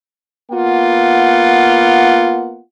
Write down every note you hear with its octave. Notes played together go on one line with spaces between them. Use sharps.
A#3 B3 F4 F#5